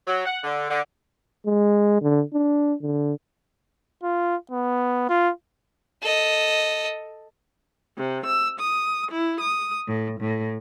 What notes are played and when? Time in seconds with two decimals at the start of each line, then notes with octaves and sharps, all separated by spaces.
0.07 F#3
0.26 F#5
0.44 D3
0.70 D3
1.46 G#3
2.01 D3
2.33 D4
2.81 D3
4.03 F4
4.51 B3
5.09 F4
6.03 A4 D#5
7.97 C3
8.26 E6
8.59 D#6
9.12 E4
9.40 D#6
9.88 A2
10.19 A2